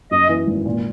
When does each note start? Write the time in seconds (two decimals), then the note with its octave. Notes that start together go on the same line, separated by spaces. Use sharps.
0.11 F#2 D#5
0.29 E3
0.47 G#1
0.66 A#2